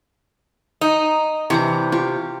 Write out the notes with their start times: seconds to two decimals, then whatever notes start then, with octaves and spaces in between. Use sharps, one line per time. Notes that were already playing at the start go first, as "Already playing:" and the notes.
0.81 D#4
1.50 C3 E3 D4 A#5
1.92 F4 G4 C#6